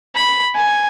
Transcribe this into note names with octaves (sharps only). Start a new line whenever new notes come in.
B5
G#5